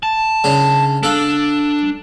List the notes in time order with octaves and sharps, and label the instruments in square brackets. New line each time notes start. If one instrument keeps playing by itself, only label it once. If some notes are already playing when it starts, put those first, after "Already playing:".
[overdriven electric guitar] A5
[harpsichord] C#3 D4
[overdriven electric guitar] D4 [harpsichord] A4 F5